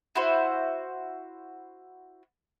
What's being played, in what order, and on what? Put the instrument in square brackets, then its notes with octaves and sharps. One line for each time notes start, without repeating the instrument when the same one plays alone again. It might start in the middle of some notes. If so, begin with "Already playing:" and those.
[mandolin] E4 F#4 C5